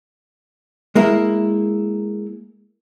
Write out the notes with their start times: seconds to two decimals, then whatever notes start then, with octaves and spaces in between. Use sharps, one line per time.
0.95 G#3 A#3 E4 A#4